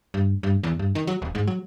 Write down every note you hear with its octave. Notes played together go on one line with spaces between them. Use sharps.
G2
G2
E2
G2
D#3
F#3
D#1
G#2
F#3